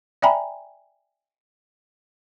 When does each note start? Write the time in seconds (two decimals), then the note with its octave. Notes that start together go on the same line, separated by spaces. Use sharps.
0.22 D5 E5 G5 G#5 A#5 B5